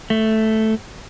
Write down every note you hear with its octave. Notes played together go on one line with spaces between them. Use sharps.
A3